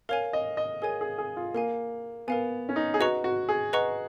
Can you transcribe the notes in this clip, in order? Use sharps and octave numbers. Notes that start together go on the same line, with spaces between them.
A#4 C#5 F5 G#5
D#5
D#5
G#4 A#4 C#5 G#5
G#4
G#4
F4
A#3 A#4 F5 G#5
B3 A#4 F5 G#5
C#4
D#4
G#4
F#4 B4 D#5 F#5 A#5 C#6
F#4
G#4
B4 D#5 F#5 A#5 C#6